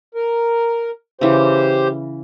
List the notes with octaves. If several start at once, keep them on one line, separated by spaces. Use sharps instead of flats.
A#4
C#3 E3 G4 C5